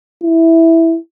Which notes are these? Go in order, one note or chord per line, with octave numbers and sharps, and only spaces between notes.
E4